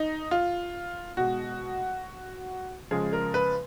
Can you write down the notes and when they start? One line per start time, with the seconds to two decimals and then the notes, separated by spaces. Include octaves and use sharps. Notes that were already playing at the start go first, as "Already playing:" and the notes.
Already playing: D#4
0.31 F4
1.17 B2 G#3 F#4
2.91 C#3 F3 G#3 G#4
3.13 A#4
3.34 B4